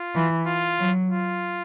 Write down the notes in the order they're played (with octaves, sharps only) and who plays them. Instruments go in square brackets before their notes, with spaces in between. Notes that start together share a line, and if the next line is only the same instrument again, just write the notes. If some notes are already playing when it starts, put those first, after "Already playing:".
Already playing: [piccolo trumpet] F4
[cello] E3
[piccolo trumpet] F4
[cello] F#3
[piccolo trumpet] F4